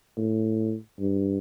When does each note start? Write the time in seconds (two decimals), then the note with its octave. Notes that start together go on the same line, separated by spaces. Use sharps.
0.17 A2
1.00 G2